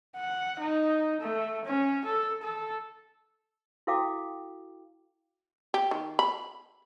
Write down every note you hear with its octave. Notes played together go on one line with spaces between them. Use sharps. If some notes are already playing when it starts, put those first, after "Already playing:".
F#5
D#4
A3
C#4
A4
A4
E4 F#4 A4 F5 G5 D6
G4
D#3
B5